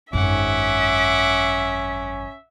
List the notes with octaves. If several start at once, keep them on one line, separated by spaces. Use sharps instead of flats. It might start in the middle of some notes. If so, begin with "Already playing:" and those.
G#1 F#2 C#4 E5 F#5 D6